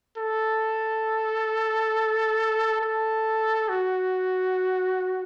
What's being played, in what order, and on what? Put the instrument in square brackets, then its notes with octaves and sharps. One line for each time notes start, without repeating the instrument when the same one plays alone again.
[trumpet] A4
A4
F#4